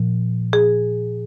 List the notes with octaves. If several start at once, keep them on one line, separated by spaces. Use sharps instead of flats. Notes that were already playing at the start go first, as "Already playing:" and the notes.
Already playing: A#2 F3
G#4